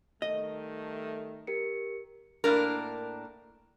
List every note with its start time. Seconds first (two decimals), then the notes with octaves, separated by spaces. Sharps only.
0.22 D#3 G3 A3 D#5
1.47 G4 A#4 C#7
2.44 A2 A#3 D4 A#4